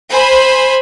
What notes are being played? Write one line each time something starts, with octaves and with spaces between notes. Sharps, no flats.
C5 G#5 B5